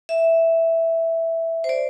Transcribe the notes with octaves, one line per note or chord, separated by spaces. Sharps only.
E5
C5
D5